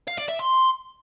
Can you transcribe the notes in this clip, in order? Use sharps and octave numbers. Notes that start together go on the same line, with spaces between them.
F5
D5
E5
C6